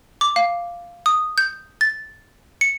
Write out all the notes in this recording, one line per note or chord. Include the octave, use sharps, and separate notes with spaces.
D6
F5
D#6
G6
A6
C#7